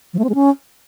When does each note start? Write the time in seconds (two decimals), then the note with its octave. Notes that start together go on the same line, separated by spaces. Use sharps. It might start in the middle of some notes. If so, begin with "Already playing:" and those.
0.13 F3
0.19 A3
0.24 C4
0.29 G#3
0.35 C#4